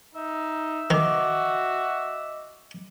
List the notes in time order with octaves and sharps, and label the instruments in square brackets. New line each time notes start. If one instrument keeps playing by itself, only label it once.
[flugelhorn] D#4 [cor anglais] E5
[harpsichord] D#3 [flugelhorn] F#4 [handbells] D#5 D6